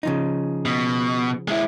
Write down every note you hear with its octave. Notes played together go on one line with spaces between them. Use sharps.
C#3 F3 D#4
B2
G#3 E4